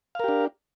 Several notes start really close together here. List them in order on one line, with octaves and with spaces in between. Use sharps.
F5 A#4 G4 D4